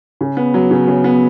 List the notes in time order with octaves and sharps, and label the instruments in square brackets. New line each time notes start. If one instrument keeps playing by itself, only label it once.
[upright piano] C#3
B3
F#3
C#3
C#3
B3